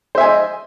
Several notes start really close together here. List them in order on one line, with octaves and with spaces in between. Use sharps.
C5 E5 G#5 D#5